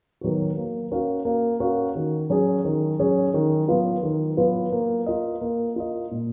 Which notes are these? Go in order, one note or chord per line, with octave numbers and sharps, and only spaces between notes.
D#3 F#3 B3 F#4
A#3
C#4 F#4 A#4 F5
A#3
C#4 F#4 A#4 F5
D#3
F#3 C#4 G#4
D#3
F#3 C#4 G#4
D#3
F#3 B3 F4 B4
D#3
F#3 B3 F4 B4
A#3
F4 A#4 D#5
A#3
F4 A#4 D#5
A#2